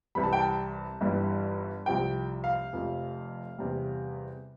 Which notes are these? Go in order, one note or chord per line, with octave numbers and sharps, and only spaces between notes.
C2 C3 E3 G3 B5
A5
G5
A5
G1 G2 E3 G3
C2 C3 F3 G5
F5
F1 F2 C3
E2 C3 G3